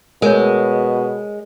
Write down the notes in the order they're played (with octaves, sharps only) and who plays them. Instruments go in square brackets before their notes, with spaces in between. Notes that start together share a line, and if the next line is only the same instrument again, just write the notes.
[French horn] B2 [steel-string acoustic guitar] G#3 [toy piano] A#4 C#5